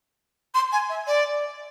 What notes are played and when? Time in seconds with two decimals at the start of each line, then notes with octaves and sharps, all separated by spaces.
0.55 C6
0.72 G#5
0.89 E5
1.07 D5